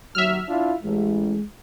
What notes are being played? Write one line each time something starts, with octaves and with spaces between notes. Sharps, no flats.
D#2 F#3 E5 F6
D4 E4 F4
A1 G#3